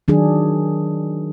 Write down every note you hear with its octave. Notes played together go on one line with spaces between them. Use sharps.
D#3 F#3 D4 G#4